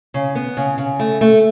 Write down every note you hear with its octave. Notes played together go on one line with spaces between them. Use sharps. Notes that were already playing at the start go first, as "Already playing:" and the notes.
C#3
B3
C#3
C#3
A3
A3